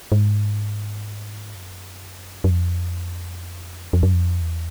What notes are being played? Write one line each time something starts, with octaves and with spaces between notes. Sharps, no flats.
G#2
F#2
F#2
F2
F2
F#2
F2
E2